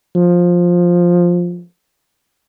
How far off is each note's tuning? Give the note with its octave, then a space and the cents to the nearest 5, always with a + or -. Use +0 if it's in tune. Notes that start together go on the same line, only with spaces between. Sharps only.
F3 +10